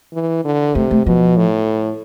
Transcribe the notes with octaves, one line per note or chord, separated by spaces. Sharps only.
E3
D3
C3 A3
A3
B2 F3
A2